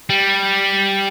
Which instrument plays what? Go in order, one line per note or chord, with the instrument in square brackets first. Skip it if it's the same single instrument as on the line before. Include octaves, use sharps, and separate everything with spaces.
[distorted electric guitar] G3